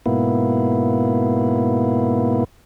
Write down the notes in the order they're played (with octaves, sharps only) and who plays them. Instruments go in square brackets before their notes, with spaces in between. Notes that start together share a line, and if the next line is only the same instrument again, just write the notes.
[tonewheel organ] G#2 B2 A#3 B3 E4